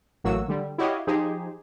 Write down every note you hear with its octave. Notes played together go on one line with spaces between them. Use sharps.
A1 A2 F#3 A#3 F#4 E6
D3 G3
E4 F#4 G4 C#5 D#5 F5
F3 D#4 G4 G#4 C5